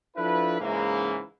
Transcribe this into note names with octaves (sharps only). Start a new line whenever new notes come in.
F3 D4 E4 A4 B4
G#2 C#3 E3 A#3